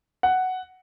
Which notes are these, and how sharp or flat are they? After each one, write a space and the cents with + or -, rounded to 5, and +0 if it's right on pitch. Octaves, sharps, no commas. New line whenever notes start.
F#5 +5